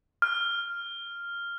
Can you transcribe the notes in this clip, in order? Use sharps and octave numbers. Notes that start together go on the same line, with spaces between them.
F6